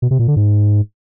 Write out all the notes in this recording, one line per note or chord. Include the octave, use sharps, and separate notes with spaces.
B2
C3
A#2
D3
G#2